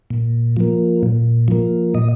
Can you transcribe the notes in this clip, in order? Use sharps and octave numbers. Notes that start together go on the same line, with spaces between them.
A#2
F3 A#3
A#2
F3 A#3
A#2 D#5